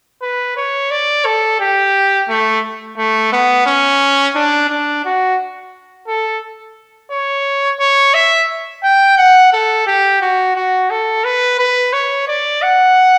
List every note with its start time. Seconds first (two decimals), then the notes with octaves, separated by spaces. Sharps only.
0.22 B4
0.57 C#5
0.91 D5
1.25 A4
1.60 G4
2.29 A3
2.98 A3
3.32 B3
3.66 C#4
4.35 D4
4.70 D4
5.05 F#4
6.08 A4
7.11 C#5
7.80 C#5
8.14 E5
8.84 G5
9.18 F#5
9.53 A4
9.87 G4
10.22 F#4
10.56 F#4
10.90 A4
11.24 B4
11.59 B4
11.93 C#5
12.28 D5
12.62 F#5